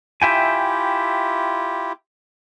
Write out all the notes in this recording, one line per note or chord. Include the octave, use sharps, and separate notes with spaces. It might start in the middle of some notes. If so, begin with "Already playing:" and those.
E4 F4 G4 E5 G5 G#5